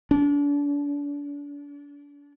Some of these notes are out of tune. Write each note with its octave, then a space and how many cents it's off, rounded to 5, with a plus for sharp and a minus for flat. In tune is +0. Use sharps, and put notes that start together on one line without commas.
D4 -35